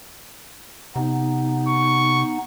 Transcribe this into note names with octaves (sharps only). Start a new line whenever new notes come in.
C3 B3 D#4
C#6